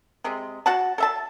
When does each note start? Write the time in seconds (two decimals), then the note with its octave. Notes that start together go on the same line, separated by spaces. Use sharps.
0.24 C3 G#3
0.66 F#4 F#5 A5
0.98 A4 E5 A5